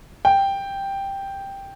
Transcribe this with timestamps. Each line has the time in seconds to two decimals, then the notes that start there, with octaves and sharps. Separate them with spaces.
0.25 G5